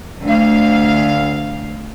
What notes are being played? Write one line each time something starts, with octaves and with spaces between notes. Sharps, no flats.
D2 F5